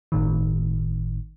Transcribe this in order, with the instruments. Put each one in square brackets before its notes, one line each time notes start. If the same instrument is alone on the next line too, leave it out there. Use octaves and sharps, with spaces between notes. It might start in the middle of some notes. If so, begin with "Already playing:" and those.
[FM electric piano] G1 A2 D#3